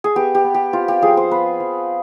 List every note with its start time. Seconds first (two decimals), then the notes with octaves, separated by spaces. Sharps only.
0.04 G#4
0.15 B3 G4
0.35 G4
0.44 B3
0.54 G4
0.73 C4 F4
0.88 G4
1.02 F3 G#4
1.17 C5
1.31 B3 B4
1.60 F3